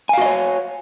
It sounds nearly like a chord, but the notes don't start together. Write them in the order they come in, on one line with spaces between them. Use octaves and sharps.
G#5 F5 F#4 D#5 C#5